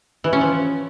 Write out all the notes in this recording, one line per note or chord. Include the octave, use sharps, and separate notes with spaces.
E3
C#4
F3